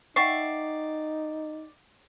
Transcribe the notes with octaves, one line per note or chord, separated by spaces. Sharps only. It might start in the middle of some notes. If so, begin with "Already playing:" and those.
D#4 D5 E5 F#5 G5 C#6 C7